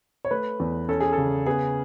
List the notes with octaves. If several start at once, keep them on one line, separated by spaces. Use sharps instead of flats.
C#5
A3 B4
E2
C#4 A4
G#4
A4
C#3
B3 G#4